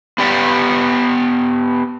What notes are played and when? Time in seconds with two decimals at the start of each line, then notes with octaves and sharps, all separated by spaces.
0.18 B3 G4 D5 F#5